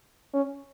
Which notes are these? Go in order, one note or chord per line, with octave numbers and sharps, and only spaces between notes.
C#4